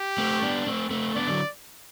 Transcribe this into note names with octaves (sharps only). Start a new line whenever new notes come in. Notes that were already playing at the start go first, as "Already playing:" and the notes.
Already playing: G4
A3 C4
B3 D4
A3 C4
A3 C4
B3 D4 D5
D3 F#3